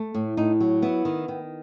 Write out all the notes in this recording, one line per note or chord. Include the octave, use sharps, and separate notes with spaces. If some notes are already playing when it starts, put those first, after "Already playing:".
Already playing: A3
A2
A2 D#4
F#3
B3 E4
D#3
D#3